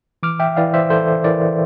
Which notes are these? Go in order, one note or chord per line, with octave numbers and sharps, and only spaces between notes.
E3 D6 F6
E5 G5
E3 D5 F5
C5 E5
E3 A4 C5
E3 A#4 D5